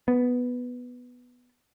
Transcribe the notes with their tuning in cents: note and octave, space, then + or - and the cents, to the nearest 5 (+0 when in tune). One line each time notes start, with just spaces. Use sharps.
B3 +0